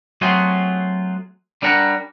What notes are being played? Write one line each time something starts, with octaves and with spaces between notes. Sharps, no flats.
F#3 A3 C4 F4 F#4 G#4
G3 D4 A#4 F#5 A#5